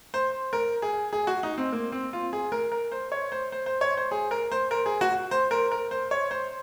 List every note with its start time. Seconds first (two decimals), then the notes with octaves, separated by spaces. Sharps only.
0.14 C5
0.53 A#4
0.82 G#4
1.13 G#4
1.27 F#4
1.43 D#4
1.58 C4
1.72 A#3
1.92 C4
2.13 F4
2.33 G#4
2.52 A#4
2.72 A#4
2.92 C5
3.12 C#5
3.32 C5
3.52 C5
3.66 C5
3.81 C#5
3.97 C5
4.11 G#4
4.31 A#4
4.52 C5
4.71 A#4
4.86 G#4
5.01 F#4
5.31 C5
5.51 A#4
5.72 A#4
5.91 C5
6.11 C#5
6.31 C5